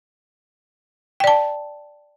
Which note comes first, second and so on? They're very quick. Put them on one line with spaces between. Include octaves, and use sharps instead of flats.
G5 D5 A5